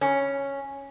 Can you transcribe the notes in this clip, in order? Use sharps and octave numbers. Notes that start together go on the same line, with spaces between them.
C#4